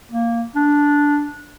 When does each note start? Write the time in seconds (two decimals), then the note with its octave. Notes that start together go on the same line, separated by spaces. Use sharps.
0.12 A#3
0.55 D4